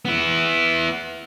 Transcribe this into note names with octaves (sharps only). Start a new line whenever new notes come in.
B3 E4